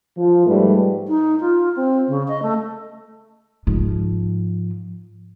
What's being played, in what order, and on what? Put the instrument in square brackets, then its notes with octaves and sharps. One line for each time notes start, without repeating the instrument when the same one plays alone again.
[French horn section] F3
G#2 G3 A3 B4
[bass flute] D#4
F4
C4
C#3
D#5
A3
[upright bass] G#2 F3